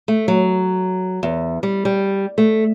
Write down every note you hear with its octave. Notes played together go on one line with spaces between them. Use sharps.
A3
F#3
E2
G3
G3
A3